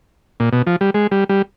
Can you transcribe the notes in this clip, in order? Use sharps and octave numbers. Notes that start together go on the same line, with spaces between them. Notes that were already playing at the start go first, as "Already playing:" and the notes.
A#2
B2
F3
G3
G#3
G3
G3